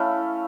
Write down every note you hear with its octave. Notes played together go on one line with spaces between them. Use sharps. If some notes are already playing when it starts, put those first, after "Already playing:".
Already playing: A3 C#4 E4 F5